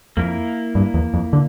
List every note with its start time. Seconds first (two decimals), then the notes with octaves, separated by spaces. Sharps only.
0.17 F2 A#3 E4 A#4
0.75 G2
0.94 E2
1.14 F2
1.33 D3